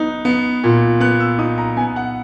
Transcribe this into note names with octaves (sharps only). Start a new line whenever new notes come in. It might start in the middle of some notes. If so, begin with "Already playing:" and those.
Already playing: B3 D#4
B3
A#2
B3 F#6
E6
D#4 D#6
A#5
B3 G#5
F#5